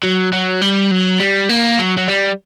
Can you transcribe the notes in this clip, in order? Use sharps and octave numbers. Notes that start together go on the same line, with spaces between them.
F#3
F#3
G3
F#3
G3
A#3
F#3
F#3
G3